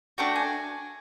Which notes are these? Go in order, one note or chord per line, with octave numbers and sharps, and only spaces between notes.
A3 D4 F#4 G5
G#5